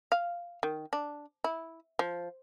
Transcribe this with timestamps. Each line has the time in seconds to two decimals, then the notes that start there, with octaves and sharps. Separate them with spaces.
0.12 F5
0.63 D#3
0.93 D4
1.44 E4
1.99 F3